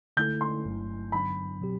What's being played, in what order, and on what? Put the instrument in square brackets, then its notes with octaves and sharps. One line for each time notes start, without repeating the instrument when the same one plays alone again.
[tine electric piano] D3 A3 E4 A4 [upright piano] G6
[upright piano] C6
[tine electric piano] G1 G2 F#3 A3 E4
[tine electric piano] G2 D3 F#3 B3 D4 [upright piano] B5
[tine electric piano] B2 F#3 C4 G4